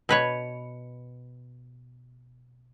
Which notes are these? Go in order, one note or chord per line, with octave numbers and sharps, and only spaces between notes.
B2 B4 C#5